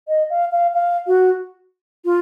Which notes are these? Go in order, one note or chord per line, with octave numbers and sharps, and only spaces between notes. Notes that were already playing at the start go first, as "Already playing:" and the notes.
D#5
F5
F5
F5
F#4
F4